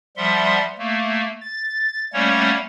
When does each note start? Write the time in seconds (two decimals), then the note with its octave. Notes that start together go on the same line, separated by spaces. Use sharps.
0.17 F3 G3 E5 F#5 C6
0.78 A3 A#3
1.41 A6
2.13 G3 A3 A#3 C#4 C#5 F#5